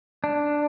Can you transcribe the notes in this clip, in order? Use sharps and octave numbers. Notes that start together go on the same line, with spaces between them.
D4